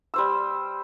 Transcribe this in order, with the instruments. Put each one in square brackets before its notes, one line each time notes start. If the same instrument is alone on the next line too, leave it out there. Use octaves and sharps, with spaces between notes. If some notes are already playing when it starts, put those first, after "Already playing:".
[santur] G3 C5 E6